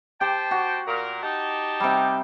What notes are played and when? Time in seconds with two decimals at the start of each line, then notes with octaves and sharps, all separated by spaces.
0.21 G4 C5 G5 A5
0.51 F#4
0.87 A#2 A#4
1.23 D#4 G4 A5
1.80 C3 G3